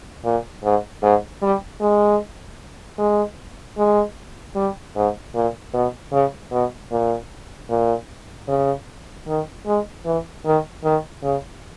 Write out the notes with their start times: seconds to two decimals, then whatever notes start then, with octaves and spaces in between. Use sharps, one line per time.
0.24 A#2
0.63 G#2
1.02 G#2
1.42 G3
1.81 G#3
2.98 G#3
3.77 G#3
4.56 G3
4.95 G#2
5.34 A#2
5.73 B2
6.12 C#3
6.52 B2
6.91 A#2
7.70 A#2
8.48 C#3
9.27 D#3
9.66 G#3
10.05 E3
10.45 D#3
10.84 D#3
11.23 C#3